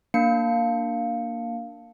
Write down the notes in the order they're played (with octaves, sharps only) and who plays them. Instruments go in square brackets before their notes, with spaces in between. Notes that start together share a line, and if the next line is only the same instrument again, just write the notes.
[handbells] A#3 D4 C#7